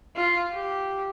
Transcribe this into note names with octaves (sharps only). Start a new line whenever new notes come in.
F4
G4